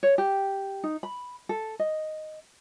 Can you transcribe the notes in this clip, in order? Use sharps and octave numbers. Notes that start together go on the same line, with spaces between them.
C#5
G4
D#4
B5
A4
D#5